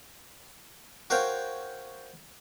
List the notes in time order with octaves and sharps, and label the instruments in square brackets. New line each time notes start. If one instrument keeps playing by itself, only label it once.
[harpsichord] F#4 A#4 C5 C#5 F5 G5